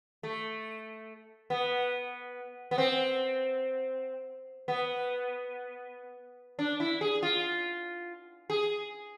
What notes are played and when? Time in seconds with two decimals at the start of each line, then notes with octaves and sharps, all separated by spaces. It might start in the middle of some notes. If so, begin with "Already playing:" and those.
0.23 A3
1.50 B3
2.71 B3
2.78 C4
4.68 B3
6.59 D4
6.80 E4
7.01 G#4
7.23 F4
8.50 G#4